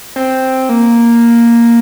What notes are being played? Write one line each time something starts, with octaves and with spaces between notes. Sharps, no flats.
C4
A#3